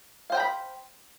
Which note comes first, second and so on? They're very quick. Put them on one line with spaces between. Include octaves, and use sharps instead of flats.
F5 C5 G5 A#5 B5